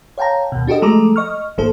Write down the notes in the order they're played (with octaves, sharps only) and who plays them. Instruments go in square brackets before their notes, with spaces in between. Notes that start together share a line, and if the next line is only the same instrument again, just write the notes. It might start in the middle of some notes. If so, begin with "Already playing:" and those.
[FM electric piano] C#5 F5 G5 A5 A#5
D#2 B2
D4 F#4 G4 A4 D#5
F3 G#3 A3 A4 A#5 D6
D#5 C#6 F6
G#1 F3 A#3 A4 C5